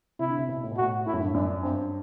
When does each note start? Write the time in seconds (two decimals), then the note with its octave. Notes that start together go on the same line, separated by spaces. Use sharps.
0.19 C3 E4
0.29 D3
0.37 C3
0.49 B2
0.63 A2
0.72 B2
0.77 F#4
0.81 A2
1.06 A2 E4
1.14 F#2
1.20 G2
1.34 F#2 D4
1.63 G2 C4